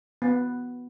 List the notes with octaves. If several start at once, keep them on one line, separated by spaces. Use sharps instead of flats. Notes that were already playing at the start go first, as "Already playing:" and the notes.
B3